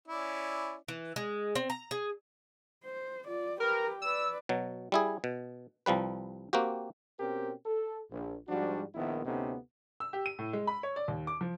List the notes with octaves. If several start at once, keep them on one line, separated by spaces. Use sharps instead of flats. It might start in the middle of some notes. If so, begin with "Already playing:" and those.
C#4 E4 D5
E3
G#3
C4
A#5
G#4
C5
F4 D5
G4 A#4 B4
B4 D5 E6
B2 F#3
G3 E4 G#4
B2
C2 F3 G3 B4
A#3 C4 F#4 G4
B2 C4 C#4 G4 A#4
A4
A#1
G#2 F3 G3 D4 F#4
A#1 D#3 B3 E4
D2 C3 B3 C#4 D#4 A4
E6
G4
D#7
A2
G#3
B5
C#5
D5
D#2
D6
F3